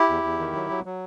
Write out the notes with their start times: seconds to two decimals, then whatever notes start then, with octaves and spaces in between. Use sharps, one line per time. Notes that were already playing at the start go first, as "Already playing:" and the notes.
Already playing: E4 G4
0.09 E2
0.23 E2
0.39 D#3
0.55 F#3
0.70 F#3
0.86 F#3